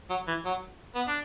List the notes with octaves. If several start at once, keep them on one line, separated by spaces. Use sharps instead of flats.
F#3
E3
F#3
B3
D4